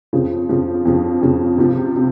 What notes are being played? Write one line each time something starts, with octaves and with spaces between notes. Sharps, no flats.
F2 C#3 F3
F2 C#3 F3
F2 C#3 F3
F2 C#3 F3
C#2 C3 F3
C3